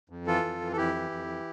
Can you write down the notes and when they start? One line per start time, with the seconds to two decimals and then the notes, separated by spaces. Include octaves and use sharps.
0.10 F2
0.27 E3 F4 A4
0.44 F2
0.61 E3
0.72 A4
0.77 F2 E4 G4
0.95 E3
1.11 F2
1.27 E3